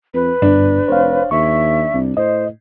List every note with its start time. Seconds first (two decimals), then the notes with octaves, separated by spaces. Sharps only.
0.14 F2 B4
0.42 G1 G2 D4
0.88 F1 C5 C#5 F5
1.31 D#2 E5 C#6
1.94 C2
2.17 A2 C5 D#5